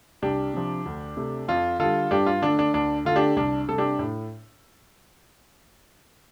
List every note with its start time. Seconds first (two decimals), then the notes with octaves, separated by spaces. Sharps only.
0.22 C2 D4 G4
0.54 C3 F3
0.86 D2
1.17 C3 A3
1.48 F2 F4
1.80 D3 G3 F4 A4
2.11 G2 D4 G4
2.26 F4
2.42 D3 A3 D4
2.59 D4
2.74 D2 D4
3.05 D3 A3 F4
3.16 D4 G4
3.36 C2 D4
3.68 C3 G3 A4
3.78 D4 G4
3.99 A2